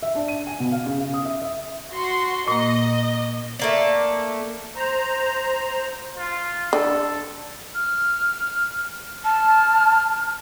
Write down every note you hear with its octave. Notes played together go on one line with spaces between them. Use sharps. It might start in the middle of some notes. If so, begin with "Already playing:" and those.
E5
D4
D#7
G#5
B2
F5
C#3
F5
D#6
E5
E5
F#4 C6
A#2 A#3 D#5
A3 A#3 D5
C5 A#5
F4
D3 A4
F6
A5 F6